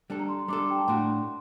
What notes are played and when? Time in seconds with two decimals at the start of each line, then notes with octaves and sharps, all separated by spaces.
0.10 G3 D4 A4
0.20 A#5
0.29 C6
0.39 C6
0.48 G3 D4 A4 D6
0.59 C6
0.70 G5
0.79 A5
0.88 A2 A3 D4 F#4 C6